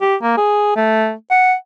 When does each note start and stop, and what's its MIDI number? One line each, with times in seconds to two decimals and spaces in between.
0.02 0.16 67
0.22 0.33 58
0.37 0.73 68
0.76 1.12 57
1.30 1.54 78